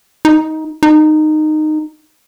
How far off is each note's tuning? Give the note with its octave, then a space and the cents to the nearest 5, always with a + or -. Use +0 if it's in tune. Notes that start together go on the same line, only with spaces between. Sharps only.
D#4 +15
D#4 -15